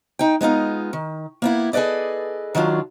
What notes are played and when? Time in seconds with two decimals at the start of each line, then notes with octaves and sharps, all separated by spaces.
0.19 D#4 G5
0.41 G#3 B3 D#4 F4
0.93 D#3
1.42 A#3 B3 E4
1.73 G#4 A4 B4 D5 D#5
2.55 D#3 F#3 D4 F4